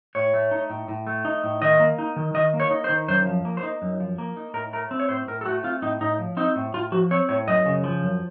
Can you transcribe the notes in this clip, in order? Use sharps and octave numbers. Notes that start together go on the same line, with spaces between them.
A2 C#5
A3
D#4
A2
A2
A3
D#4
A2
D#3 D#5
A#3
D#4
D#3
D#3 D#5
A#3
C#5
D#4
C5
D#3
F#2 C5
F3
A#3
C5
D#4
F#2
F3
A#3
D#4
A2 A#4
A3 A#4
C4
C#5
A2 C5
A2 A#4
A4
A3 F#4
C4 F4
A2 D#4
A2 D#4
F3
C4 D#4
A2
A2 F4
F3 F#4
C4 C#5
A2 C#5
F#2 D#5
C#3
F3
F#2